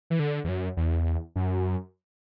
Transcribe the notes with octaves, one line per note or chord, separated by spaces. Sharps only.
E3
D3
E2
F#2
E2
F#2